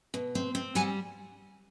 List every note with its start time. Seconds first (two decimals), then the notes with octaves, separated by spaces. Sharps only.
0.14 B2
0.35 C4
0.55 C4
0.75 G3 F#5 G#5